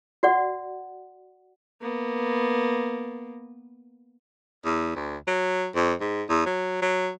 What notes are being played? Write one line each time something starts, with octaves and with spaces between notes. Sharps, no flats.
F#4 D5 F#5
A#3 B3
E2
D2
F#3
F2
G#2
E2
F#3
F#3